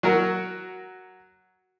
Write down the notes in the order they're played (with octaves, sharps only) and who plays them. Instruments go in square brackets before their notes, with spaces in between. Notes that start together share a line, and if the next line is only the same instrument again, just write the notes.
[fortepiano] F#3 F#4 A#4